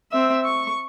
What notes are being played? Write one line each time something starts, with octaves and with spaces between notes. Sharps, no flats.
C4 E5
C#6